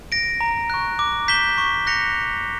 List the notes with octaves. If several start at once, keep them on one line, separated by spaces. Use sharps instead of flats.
A#6 D7
A#5
C#6 F#6
D6
G6 B6 E7 G7
C#6
F#6 A#6 C#7 F7